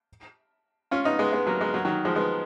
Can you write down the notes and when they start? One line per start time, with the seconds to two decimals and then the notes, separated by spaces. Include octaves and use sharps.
0.91 C#4 F4
1.05 B3 D#4
1.19 G#3 B3
1.32 G#3 B3
1.47 F#3 A#3
1.61 G#3 B3
1.74 F#3 A#3
1.85 D#3 F#3
2.05 F3 G#3
2.15 G#3 B3